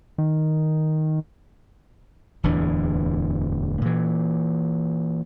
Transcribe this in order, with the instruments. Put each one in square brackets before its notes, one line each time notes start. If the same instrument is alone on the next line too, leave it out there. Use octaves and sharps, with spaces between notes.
[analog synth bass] D#3
[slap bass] D1 E2 E3 D4
A#2 E3